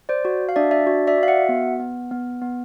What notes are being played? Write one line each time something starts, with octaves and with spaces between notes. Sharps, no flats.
C5 D5
F#4
F5
D4 D5 E5
D5 E5
F#4
D5 E5
F#4
F5
E5 F#5
B3
B3
B3
B3